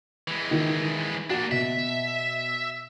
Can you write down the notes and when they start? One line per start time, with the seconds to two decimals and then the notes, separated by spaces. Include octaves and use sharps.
0.28 E3 G#3
0.51 D#3
1.30 A#3 D4 F#4
1.51 B2 E5